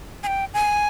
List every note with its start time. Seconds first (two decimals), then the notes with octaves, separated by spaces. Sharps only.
0.23 G#5
0.27 G5
0.54 G#5